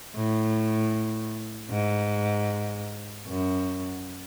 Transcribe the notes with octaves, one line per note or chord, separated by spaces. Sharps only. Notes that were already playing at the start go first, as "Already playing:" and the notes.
A2
G#2
F#2